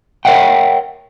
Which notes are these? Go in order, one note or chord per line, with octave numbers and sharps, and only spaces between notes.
A#4 C#5 E5 F#5 G5